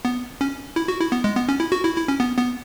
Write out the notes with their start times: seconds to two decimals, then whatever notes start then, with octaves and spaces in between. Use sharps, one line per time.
0.05 B3
0.41 C#4
0.76 E4
0.88 F#4
1.00 E4
1.12 B3
1.24 G#3
1.36 B3
1.49 C#4
1.60 E4
1.72 F#4
1.84 E4
1.96 E4
2.08 C#4
2.20 B3
2.38 B3